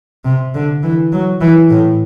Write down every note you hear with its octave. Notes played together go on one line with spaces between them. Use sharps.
C3
D3
E3
F#3
E3
A2